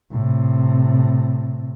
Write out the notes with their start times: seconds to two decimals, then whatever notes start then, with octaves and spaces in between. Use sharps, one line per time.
0.12 A2 C3